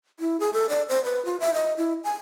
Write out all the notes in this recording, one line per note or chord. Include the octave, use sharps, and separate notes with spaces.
E4
G#4
A4
D5
C5
B4
F4
E5
D#5
E4
G#5